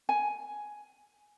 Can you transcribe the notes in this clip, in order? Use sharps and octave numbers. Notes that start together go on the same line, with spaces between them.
G#5